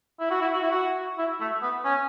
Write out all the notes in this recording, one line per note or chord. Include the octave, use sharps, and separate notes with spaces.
E4
F#4
E4
F#4
E4
F#4
E4
A3
B3
C#4